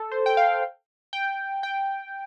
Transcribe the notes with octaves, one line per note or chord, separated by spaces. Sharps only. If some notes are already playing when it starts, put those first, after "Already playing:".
Already playing: A4
C5
G5
F5
G5
G5